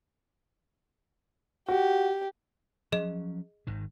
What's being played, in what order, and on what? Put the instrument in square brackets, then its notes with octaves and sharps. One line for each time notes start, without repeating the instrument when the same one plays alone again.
[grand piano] F#4 [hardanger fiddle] G4
[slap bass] F3 F#3 C#4 [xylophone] G#4 D#5
[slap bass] G#1 G#2 D#3